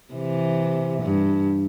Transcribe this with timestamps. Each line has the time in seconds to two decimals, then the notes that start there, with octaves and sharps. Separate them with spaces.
0.14 C3 E3
1.03 G2